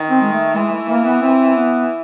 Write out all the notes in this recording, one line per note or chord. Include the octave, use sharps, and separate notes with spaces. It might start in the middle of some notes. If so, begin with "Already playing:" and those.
Already playing: D#3
C4
G#3
A3
E3 G#3
A3
A#3
B3
C4
B3